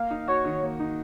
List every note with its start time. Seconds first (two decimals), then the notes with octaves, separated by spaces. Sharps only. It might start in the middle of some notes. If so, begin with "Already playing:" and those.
Already playing: A#3 F5
0.11 D#4
0.28 F#4 C#5
0.45 D#3
0.63 A#3
0.80 D#4